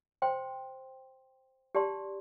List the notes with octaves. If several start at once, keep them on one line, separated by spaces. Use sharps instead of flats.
C5 G5 C6
G4 D5 A5 C6